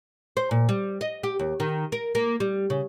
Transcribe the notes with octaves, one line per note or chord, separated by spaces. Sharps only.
C5
A#2
G3
D#5
G4
D#2
D#3
A#4
A#3
G3
C#3